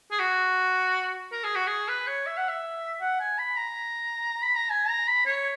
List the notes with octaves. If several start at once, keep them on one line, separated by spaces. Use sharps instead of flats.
G#4
F#4
A#4
G#4
F#4
G#4
B4
C#5
E5
F#5
E5
F#5
G#5
B5
A#5
B5
A#5
G#5
A#5
B5
C#5